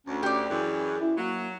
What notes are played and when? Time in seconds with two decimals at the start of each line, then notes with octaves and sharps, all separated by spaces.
0.07 D2 C#4
0.23 C#4 G4 D5
0.49 F#2 E3 G#4
1.00 E4
1.18 F#3 A#3